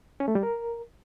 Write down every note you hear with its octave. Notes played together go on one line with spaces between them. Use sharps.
C#4
A3
G3
A#4